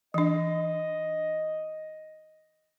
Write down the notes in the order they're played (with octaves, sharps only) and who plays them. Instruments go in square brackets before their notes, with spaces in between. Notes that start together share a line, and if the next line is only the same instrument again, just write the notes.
[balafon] E3 D4 [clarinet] D#5